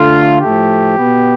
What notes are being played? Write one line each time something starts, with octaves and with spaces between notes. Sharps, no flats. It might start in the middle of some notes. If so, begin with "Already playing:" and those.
Already playing: D3 A3 F4
A2 F3 A3 G4
B2 B3